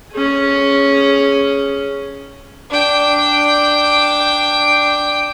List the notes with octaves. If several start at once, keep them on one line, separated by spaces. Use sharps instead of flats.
C#4 G#4
D4 G5